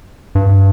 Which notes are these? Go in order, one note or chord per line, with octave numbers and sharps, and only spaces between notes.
G2